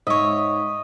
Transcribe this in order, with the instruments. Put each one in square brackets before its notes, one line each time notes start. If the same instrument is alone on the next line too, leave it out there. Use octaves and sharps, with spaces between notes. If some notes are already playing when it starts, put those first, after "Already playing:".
[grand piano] G#2 [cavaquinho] C#5 E5 [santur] D#5